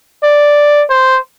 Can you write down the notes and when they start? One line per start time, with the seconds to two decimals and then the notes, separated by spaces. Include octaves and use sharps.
0.23 D5
0.90 C5